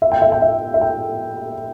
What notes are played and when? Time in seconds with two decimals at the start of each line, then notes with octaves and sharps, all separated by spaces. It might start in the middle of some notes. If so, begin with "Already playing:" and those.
0.02 E5
0.12 G5
0.22 E5
0.32 G5
0.42 E5
0.74 E5
0.81 G5